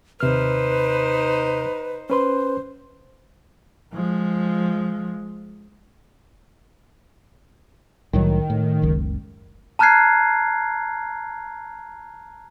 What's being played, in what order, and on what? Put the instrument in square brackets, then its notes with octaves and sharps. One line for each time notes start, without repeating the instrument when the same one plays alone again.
[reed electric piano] D#2 C3 F6 [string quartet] D#4 C5 [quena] B4
[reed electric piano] C#4 B4 C6 [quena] C5
[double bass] F3 G#3
[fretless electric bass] C2 A2 F#3 [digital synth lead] D#3
[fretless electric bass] A2
F#1 C#2
[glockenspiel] A5 A#5 F6 F#6 G#6 C7